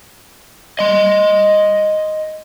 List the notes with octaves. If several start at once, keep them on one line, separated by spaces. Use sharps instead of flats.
D#5 C6